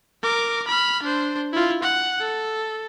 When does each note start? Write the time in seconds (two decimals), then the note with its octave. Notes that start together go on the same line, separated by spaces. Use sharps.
0.22 A#4 D6
0.68 B5 F6
1.03 D4 C5
1.53 E4 F4
1.83 F#5
2.20 A4